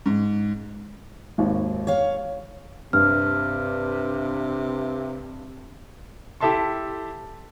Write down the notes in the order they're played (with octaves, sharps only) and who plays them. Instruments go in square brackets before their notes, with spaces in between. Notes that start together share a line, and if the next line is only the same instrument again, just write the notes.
[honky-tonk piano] G#2
[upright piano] G#1 D#2
[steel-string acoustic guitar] C#5 F5
[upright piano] G2 [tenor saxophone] C3 [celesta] F6
[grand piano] E4 G4 A4 E5 A5 C6